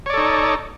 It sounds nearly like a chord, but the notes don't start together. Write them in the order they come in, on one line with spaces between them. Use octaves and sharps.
C#5 D5 A4 D#4